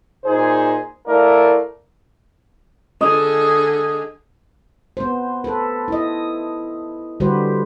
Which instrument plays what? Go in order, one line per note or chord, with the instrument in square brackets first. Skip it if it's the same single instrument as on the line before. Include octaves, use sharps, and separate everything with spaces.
[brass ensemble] A#2 D#4 G#4 C5
A3 E4 A#4 D5 F5
[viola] D3 G#4 [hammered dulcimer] D#5
[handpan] B3 C5
A4 B4
E4 D#5
D3 G3 F#4 G4 B4 C5